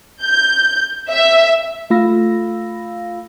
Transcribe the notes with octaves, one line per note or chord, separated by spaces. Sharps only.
G6
E5
A3 F4 F5 B5 E6 A#6